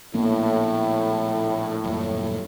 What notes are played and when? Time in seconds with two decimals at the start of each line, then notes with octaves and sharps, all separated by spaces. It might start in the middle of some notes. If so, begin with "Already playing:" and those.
0.14 A#1 A2 A#3 B3
1.84 D#1 F#2 A#2